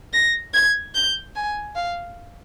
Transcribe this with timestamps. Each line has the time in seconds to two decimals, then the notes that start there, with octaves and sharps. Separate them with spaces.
0.13 A#6
0.53 G#6
0.94 G6
1.35 G#5
1.75 F5